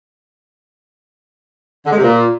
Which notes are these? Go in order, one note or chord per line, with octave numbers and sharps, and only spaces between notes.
D3
G#3
C3
A#2